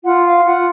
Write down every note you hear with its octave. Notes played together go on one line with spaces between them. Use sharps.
F4 F#5
F5
F4 F#5